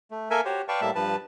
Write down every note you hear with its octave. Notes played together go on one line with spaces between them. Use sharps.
A3
A#3 A4 A#4 E5 G#5
F#4 G4 C5 C#5
B4 D5 F5 G5 A5 C#6
A2 G3 A#3 E5 A5
G2 F3 B4 A5